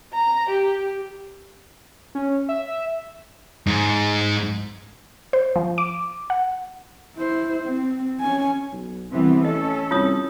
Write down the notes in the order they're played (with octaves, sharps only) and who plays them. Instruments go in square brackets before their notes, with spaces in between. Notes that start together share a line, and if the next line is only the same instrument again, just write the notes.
[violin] A#5
G4
[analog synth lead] C#4
E5
[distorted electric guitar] G#2
[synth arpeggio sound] C5
F3
D6
F#5
[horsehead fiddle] E4 C5
C4
C#4 G#5
[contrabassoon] B1
[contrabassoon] C2 [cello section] E3 B3 C4
[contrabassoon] A1 [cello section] C#4 A4 [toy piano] D#5
[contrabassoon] C2 [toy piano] F4 C#5 D#6